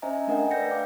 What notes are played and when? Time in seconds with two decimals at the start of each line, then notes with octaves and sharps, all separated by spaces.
0.02 C#4 C5 D#5 E5 G#5 A#5
0.27 A3 D4 A#4 D#5 F#5 G5
0.51 B4 D5 G6 A#6 C#7
0.70 F5 G5 D6